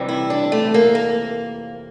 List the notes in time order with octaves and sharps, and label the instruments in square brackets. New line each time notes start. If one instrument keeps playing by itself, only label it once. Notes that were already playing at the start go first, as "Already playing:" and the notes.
Already playing: [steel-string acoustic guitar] F2 C3 E3 G3
E4
D4
A3
A#3
A#3